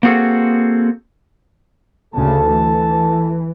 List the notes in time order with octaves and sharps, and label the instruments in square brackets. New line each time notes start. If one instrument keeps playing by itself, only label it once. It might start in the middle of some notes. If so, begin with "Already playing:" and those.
[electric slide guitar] A#3 C4 F#4 G#4 A4
[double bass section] D2 C#3 [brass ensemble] A4 A5
[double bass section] E3